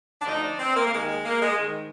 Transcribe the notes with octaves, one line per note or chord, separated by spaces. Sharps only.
D4
D2 D3 F3 D#4
D4
C4
A#3
A#3
D#2 D#3 G#3
G#3
A#3
G#3
G#2 D#3